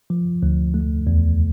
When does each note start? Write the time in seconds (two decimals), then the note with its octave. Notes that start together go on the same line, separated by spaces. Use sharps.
0.10 F3
0.43 D2
0.74 A3
1.07 E2